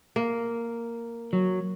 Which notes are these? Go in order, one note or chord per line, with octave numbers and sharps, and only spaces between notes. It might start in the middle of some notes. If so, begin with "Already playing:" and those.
A#3
F#3